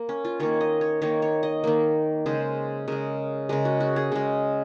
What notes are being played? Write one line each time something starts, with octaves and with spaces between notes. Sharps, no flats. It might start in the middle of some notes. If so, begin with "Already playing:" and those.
Already playing: A#3
C#4
F4
D#3 A#3 C#5
D#5
C#5
D#3 A#3 C#5
C#5
D#5
D#3 A#3
C#3 G#3 C5
C#3 G#3 A#4
C#3 G#3 A#4
F#4
F#4
G#4
C#3 G#3